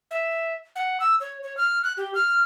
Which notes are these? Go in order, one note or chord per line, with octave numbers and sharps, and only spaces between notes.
E5
F#5
E6
C#5
C#5
F6
F#6
G4
F6